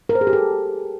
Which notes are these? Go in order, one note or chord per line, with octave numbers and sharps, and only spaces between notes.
A#4
C5
G#4
G4
A4